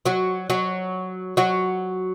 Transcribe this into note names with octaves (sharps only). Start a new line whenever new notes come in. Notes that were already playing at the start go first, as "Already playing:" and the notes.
F#3 F#4
F#3 F#4
F#3 F#4